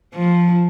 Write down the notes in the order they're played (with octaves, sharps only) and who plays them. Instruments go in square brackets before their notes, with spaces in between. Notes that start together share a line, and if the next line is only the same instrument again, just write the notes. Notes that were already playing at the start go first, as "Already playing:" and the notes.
[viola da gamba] F3